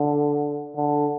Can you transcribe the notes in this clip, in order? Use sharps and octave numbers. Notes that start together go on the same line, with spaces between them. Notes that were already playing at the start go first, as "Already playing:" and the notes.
Already playing: D3
D3